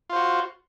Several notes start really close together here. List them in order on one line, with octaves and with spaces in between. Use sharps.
F4 C5 F#4